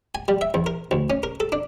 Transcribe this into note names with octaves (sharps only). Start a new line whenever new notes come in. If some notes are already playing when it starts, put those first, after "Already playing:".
G#5
G3
E5
E2
A#4
D2
C#4
A#4
A4
D4